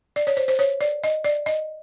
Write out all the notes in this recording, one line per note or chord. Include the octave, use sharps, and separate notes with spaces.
D5
C#5
C5
C5
C#5
D5
D#5
D5
D#5